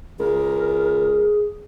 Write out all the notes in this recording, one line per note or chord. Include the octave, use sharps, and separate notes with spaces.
C#2 G#4 A#4